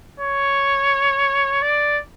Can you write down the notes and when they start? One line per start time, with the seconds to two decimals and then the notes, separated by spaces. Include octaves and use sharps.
0.20 C#5
1.62 D5